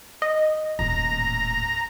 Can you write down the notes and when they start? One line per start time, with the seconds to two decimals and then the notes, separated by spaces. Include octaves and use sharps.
0.22 D#5
0.79 D#1 A2 A#5